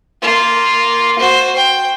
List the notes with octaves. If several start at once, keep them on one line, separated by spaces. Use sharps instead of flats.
A#3 F4
F#4 C5
G5